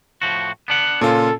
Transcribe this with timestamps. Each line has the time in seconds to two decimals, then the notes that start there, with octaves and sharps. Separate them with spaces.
0.22 A2 F3 F#4
0.68 B3 D4 F#5
1.01 A#2 C#3 C#4 F4 A4